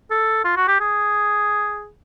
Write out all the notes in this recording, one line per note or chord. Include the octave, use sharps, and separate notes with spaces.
A4
F4
F#4
G4
G#4